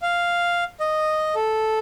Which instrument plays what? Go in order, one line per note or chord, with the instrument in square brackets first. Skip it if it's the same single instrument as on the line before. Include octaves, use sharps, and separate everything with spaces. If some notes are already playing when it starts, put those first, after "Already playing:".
[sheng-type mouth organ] F5
D#5
A4